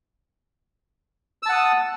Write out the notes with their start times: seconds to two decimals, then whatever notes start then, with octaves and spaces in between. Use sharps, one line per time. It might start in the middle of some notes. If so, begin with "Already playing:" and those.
1.43 E6
1.46 A5
1.49 F#5
1.52 D#6